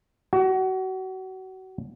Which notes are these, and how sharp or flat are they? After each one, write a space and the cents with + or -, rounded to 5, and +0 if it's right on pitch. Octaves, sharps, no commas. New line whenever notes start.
F#4 +30